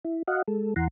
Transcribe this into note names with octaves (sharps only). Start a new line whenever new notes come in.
E4
F#4 D#5 F5 F#5
G#3 A4
E2 E3 F#5 A#5 C6